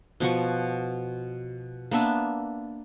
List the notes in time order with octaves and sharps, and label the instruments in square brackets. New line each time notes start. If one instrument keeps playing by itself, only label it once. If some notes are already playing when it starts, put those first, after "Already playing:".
[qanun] B2 F3 F#4 C#6
A#3 B3 D4 E5